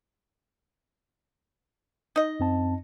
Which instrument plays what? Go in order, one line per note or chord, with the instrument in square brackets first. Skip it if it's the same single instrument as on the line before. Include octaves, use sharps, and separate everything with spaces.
[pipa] D#4 D#5
[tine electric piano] F#2 C4 A5